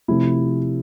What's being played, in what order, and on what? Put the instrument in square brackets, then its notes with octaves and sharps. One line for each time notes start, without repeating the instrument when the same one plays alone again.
[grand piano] C3 F3 A3 E4